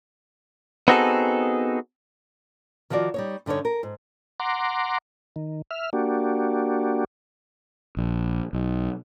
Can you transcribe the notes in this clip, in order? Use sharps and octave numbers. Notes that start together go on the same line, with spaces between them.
B3 C4 D#4 F#4 G#4 A4
D#3 F3 F4 F#4 D5
G3 D#4 C#5
G2 D3 C#4 D#4 C#5
A#4
G#2
F#5 A#5 C6 D6
D#3
E5 F6
A#3 D4 F#4 G4
A#1
B1